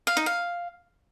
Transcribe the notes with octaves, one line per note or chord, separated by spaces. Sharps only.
F5
D#4
F5